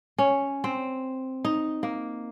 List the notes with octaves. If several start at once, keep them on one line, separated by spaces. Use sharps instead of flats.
C#4
C4
D#4
A#3